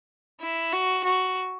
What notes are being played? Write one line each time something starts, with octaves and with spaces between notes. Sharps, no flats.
E4
F#4
F#4